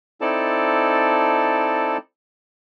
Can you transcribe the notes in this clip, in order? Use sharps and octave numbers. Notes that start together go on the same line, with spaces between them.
C4 D#4 E4 A4 D5 A5